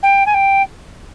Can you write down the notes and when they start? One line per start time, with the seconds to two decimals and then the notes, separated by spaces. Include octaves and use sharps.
0.02 G5
0.25 G#5
0.34 G5